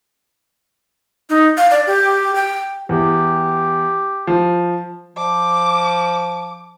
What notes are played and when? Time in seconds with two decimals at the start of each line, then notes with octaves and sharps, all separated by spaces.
1.29 D#4
1.57 F5
1.71 D5
1.87 G4
2.35 G5
2.89 E2 G4
4.27 F3
5.17 F3 D6